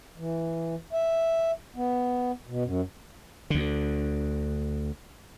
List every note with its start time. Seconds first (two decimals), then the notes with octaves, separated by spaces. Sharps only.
0.18 E3
0.93 E5
1.76 B3
2.47 B2
2.65 F#2
3.50 D2 D3